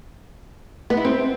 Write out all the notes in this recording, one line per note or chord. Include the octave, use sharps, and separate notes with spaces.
B3
E4
C4